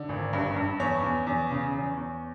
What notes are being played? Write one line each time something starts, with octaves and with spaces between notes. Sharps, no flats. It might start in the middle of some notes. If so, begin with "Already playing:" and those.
Already playing: D3
G#1
G2
G2
E2 C#5
E2
E2
C#3
E2
E2